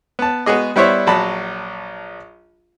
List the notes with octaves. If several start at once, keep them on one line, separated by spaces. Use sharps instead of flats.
B3 A5
G#3 B3 F#4 G#4 D#5
G3 B3 E4 C5 C#5 E5
A#1 F#3 A5 B5